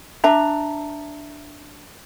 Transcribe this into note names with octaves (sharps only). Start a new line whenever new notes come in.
D4 E5 A#5